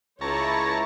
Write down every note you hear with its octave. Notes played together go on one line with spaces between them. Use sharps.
C#2 E4 C#5 A5 A#5 C#6